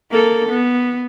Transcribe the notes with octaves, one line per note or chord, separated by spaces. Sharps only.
A#3 A4
B3